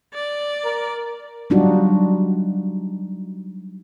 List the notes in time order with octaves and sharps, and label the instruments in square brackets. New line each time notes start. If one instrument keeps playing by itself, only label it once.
[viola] D5
[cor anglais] A#4
[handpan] F#3 G3 D4 D#4 F4 F#4